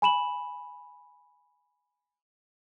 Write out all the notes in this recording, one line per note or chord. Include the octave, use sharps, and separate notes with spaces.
G#5 B5 E7 F#7